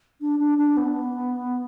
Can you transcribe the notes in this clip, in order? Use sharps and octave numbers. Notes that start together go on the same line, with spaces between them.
D4
D4
D4
B3